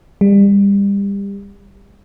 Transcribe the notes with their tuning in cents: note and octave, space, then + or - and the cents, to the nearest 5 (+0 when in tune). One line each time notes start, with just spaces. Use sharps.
G3 +30